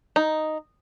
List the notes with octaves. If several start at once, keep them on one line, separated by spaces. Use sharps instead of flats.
D#4